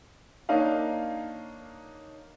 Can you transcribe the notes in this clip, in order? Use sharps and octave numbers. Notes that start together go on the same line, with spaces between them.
A#3 D4 D#4 C#5 F5